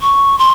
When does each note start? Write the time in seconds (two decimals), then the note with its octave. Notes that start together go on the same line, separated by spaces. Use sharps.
0.02 C#6
0.39 C6